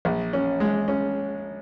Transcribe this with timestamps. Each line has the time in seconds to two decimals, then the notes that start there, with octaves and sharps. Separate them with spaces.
0.05 A#1
0.33 C#4
0.60 G#3
0.88 C#4